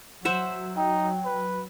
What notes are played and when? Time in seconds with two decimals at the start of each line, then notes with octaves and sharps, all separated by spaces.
0.25 F#3 C5 E5 F#5
0.77 D#4 G5
1.25 B4